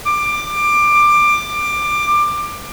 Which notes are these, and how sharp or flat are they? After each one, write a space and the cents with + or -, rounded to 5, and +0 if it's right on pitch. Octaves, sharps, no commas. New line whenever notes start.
D6 +20